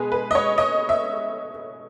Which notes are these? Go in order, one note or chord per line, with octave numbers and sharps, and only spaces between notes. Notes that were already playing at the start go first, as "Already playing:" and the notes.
Already playing: B2 G#3 G#4 B4
B4
D#5
C#5
D#5
E5